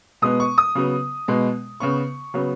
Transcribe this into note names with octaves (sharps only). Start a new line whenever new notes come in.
B2 G#3 B3 D#6
C#6
D#6
C#3 F#3 B3
B2 G#3 B3
C#3 B3 C#6
C#3 F#3 B3